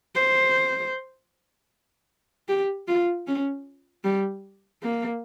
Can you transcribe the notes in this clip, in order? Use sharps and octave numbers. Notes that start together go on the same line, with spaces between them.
C5
G4
F4
C#4
G3
A#3